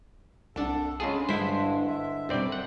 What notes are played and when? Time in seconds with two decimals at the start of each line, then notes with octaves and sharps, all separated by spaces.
0.56 C2 D4 A4 F#5 A5
1.00 C#3 G#3 D4 F4 G#4 A4
1.29 G2 D3 G#3 E4 C5 F#5 B6
1.86 E5
2.29 C2 F#2 B2 G3 C4 A4 D5
2.52 F#5